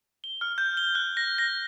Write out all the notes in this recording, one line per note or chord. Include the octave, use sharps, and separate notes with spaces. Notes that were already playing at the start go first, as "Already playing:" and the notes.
G7
F6
G6
G7
F#6
A#6
A#6